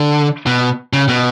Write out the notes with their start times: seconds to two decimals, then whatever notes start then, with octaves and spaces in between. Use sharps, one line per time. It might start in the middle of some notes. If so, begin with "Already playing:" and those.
Already playing: D3
0.46 B2
0.93 C#3
1.09 B2